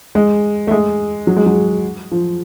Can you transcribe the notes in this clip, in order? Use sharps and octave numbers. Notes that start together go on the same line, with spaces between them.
G#3
A3
G#3
F#3
G#3
F#3
F3